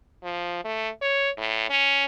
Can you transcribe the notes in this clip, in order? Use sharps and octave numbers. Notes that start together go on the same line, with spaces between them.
F3
A3
C#5
A2
C#4